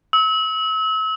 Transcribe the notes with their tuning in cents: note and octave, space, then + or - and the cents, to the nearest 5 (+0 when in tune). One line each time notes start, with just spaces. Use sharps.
E6 -35